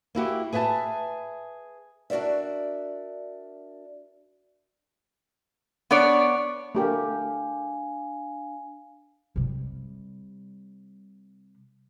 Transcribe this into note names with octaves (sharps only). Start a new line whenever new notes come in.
A#3 E4 F#4 G4
G#4 B4 E5 F#5 A5
D4 F#4 A#4 D5 E5
B3 D4 C#5 D5
A3 D4 G4 A#4 F5 G#5
C3 G3